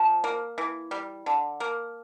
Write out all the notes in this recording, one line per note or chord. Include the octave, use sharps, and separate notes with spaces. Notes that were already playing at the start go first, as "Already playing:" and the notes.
Already playing: F3
A#3
E3
G3
D3
A#3